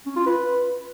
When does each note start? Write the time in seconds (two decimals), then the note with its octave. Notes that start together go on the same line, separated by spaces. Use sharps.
0.06 C#4
0.16 F4
0.27 B4